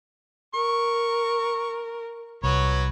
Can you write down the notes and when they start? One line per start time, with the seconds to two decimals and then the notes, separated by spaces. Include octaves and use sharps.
0.54 A#4 C#6
2.43 C2 F#3 B4 C#5